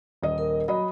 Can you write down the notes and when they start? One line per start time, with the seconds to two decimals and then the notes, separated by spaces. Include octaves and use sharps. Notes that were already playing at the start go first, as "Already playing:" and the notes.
0.23 D#1 D#5
0.38 A#4
0.68 F#3 D#5 B5